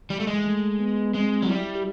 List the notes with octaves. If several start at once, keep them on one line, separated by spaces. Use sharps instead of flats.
E3 G3
A3
G#3
A3
B3
G#3 C4
F#3
G3 E4
G4